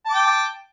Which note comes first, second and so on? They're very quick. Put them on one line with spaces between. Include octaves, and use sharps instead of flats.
A5 D6 G5